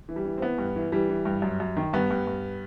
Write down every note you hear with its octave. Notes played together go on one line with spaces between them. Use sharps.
E3
G3
E3
C4
E3 B3
G2
E3
E3 G3
E3
G2
F#2
F#2
D#3
G2 B3
G2
G2